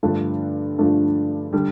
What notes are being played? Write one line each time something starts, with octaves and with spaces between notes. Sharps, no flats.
G2 D3 F3 A3 D4
G2 D3 F3 A3 D4
D3 G3